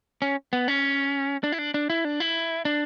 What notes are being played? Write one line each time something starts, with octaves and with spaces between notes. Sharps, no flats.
C#4
B3
C#4
D4
E4
D4
D4
E4
D4
E4
D4